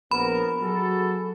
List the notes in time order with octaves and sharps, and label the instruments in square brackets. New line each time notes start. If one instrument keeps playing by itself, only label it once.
[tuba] A#1 [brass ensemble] B3 A#4 [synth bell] B5
[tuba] F#3 [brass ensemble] F#4 G#4 A4